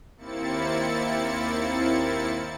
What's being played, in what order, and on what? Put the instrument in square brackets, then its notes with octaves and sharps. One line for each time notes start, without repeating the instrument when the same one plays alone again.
[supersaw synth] D#2 A#3 C4 E4 A6 C#7